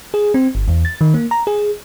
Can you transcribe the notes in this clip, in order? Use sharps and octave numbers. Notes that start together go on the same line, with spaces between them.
G#4
C4
G1
E2
A6
D#3
A#3
A#5
G#4